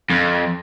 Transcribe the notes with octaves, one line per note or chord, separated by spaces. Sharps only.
F2